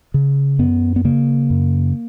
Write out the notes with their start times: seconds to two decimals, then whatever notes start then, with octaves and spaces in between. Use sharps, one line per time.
0.14 C#3
0.59 F#2 B3
0.96 B3
1.05 C#3 A#3
1.50 F#2